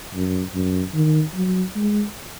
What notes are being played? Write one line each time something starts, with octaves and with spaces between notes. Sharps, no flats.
F#2
F#2
D#3
F#3
G#3